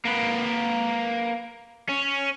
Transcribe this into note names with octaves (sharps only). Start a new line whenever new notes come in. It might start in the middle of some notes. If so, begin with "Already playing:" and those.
A#3 B4
C#4